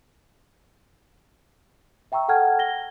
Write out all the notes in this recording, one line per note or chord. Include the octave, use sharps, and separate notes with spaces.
E5 G5 A#5 C#6 E6
A4 F#5 G5 A5 F6 G#6
A#6 G7